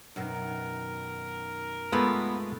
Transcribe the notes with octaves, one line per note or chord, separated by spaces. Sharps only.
F#2 B2 D#3 A#4
G#3 A3 B3 F4 B5